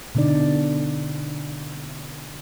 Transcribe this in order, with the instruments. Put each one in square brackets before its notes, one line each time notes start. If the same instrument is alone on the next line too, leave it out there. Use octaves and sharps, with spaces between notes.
[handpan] B2 D3 D4 D#4 D5